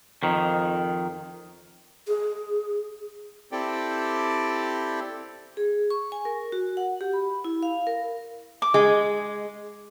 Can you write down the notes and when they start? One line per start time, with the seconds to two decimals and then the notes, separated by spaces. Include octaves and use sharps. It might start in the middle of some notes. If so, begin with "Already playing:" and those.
0.23 F2 D#3
2.08 G#4
3.52 C4 E4 G4 A4 D5 G5
5.57 G#4
5.90 C#6
6.12 G#5
6.25 A#4
6.52 F#4
6.77 F#5
7.01 G4
7.13 B5
7.44 E4
7.63 F5
7.87 A#4
8.62 D6
8.74 G#3